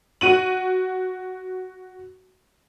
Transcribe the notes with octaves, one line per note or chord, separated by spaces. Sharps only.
F#4 D#7 F#7